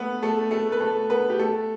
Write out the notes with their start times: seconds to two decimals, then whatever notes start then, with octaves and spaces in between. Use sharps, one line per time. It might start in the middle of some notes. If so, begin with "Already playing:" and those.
Already playing: A3 B3 A4 B4
0.23 A3 A4
0.51 A3 A4
0.72 B4
0.81 A3 A4
1.10 B3 B4
1.30 G4
1.39 A3 A4